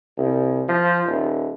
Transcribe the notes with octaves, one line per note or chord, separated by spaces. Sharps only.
C2
F3
D#1